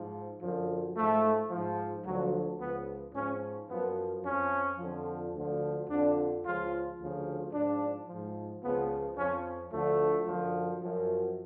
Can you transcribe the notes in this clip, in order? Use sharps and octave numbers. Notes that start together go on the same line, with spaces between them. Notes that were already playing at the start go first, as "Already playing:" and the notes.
Already playing: G#2 F3
F#2 D3 F3
G#2 F3 A3
G#2 F3
D2 D3 F3 F#3
C#2 C#3 F3 B3
G#2 F3 C#4
F#2 F3 B3
F2 F3 C#4
F2 D3 F3
D2 D3 F3
F2 D3 F3 D4
C#2 C#3 F3 F4
D2 C#3 F3
G#2 F3 D4
G#2 F3
C#2 C#3 F3 B3
F2 F3 C#4
D2 D3 F3 A3
F#2 D3 F3
F#2 F3